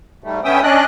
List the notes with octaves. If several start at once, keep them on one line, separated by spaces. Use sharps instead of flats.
G#2 G3 A3
D3 B3 C#4 E5 G5 D#6
C#4 D4 D5 D#5 F#6